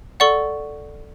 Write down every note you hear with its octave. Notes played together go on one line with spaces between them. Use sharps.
A4 D5 F#5 C#6